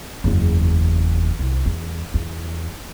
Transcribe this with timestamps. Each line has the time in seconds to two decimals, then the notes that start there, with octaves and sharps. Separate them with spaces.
0.24 F#1 E2
1.39 C2
1.66 E2
2.14 E2